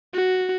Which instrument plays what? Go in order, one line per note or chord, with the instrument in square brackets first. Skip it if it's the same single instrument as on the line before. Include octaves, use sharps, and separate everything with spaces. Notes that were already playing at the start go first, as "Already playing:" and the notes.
[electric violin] F#4